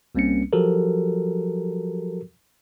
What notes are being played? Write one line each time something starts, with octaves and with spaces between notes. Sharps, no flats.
C2 G3 A#3 C4 C#4 C#7
F3 F#3 F#4 G4 A4 A#4